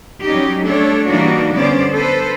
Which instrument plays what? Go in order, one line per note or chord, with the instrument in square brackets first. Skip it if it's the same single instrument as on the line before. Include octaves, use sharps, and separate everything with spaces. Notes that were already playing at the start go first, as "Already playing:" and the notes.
[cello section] F#3 G3 C#4 D#4 G4
G3 A3 D4 A4 C#5
E3 G3 A#3 D4 D#4 F#4
D3 G3 B3 C#4 C5 D5
A4 B4 C5